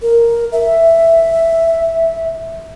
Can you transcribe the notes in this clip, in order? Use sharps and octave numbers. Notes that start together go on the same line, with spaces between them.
A#4
E5